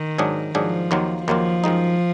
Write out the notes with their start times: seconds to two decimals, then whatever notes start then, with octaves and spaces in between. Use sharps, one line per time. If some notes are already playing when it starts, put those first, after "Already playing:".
Already playing: D#3
0.18 G#2 F#3 D4 G#4
0.55 G#2 F3 F#3 D4 G#4
0.91 D#2 D#3 F#3 A#3 F4
1.28 D#2 D#3 F3 F#3 A#3 F4
1.64 F#2 D#3 G#3 D#4